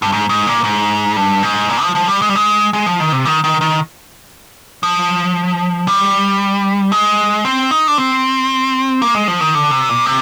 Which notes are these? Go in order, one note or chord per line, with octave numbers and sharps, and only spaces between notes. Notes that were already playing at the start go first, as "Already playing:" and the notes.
G2
G#2
G#2
A#2
G#2
G2
G#2
A#2
F3
F3
G3
G#3
G3
G#3
G#3
F3
D#3
C3
D#3
D#3
D#3
F3
G3
G#3
C4
D#4
D4
C4
A#3
G#3
F3
D#3
D3
C3
A#2
C3